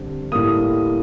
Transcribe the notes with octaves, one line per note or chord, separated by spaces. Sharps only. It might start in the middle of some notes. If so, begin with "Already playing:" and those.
Already playing: D3 G3 C4
A2 G3 A#3 D#6